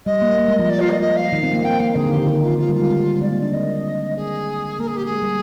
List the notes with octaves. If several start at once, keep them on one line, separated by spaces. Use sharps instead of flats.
G3 D#5
A#3
A#3
G#3
F3
D5
F4
D#5
D#5
F5
D#3
C4
A#3
C4 G5
A#3 F5
D3 G#4
D#3
G4
D#3
D3 D#4
F4
D#3 F4
G3
G#3 F4
C4
G#3
G3
G#3 D5
A#3
D4
C4 D#5
G#4
A#3 A#4
G#4
G4
G#4
G#3
G3